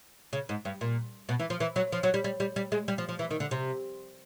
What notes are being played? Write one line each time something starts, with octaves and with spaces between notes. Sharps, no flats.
C#3
G#2
G2
A#2
B2
E3
F3
E3
F#3
F3
F#3
G3
G3
G3
G3
G#3
G3
F3
F3
E3
D#3
D3
C3